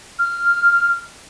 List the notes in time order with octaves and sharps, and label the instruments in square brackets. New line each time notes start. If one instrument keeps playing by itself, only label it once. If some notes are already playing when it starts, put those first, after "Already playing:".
[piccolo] F6